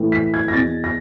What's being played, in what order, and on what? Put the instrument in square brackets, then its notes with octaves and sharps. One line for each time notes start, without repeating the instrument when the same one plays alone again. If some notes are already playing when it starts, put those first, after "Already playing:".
Already playing: [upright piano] A2 E3
B6
G#6
A#6
E2 B2 A6
A#6